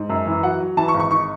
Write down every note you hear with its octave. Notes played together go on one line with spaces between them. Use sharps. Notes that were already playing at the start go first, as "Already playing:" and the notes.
Already playing: G#2
F#2
E3
F#3 F#5
F#3
E3 A5
C#6
G#1
C#6
D#4 C#6